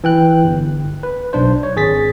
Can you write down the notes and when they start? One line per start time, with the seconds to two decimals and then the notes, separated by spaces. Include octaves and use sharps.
0.04 E3 G5 F#6
0.43 G1
1.03 B4
1.33 B1 D4 C5
1.63 C#5
1.76 G#1 G#4 A6 B6